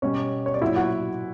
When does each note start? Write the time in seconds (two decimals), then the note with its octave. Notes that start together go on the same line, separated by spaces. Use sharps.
0.02 B2 G3 C#4 C#5
0.46 C#5
0.54 D5
0.62 A#2 F#3 E4 E5
0.76 F#4 F#5